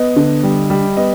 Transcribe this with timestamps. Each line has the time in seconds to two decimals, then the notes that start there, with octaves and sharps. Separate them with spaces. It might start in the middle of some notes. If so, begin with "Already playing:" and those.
Already playing: B3 D#5
0.16 D3
0.43 G3
0.70 G3
0.97 B3 D#5